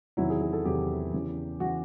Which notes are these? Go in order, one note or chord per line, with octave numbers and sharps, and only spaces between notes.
E2 C3 D#3 F#3 E4
G#4
G#4
A4
E2 C3 D#3 F#3 G4
E2 C#3 E3
C#3 E3 F#4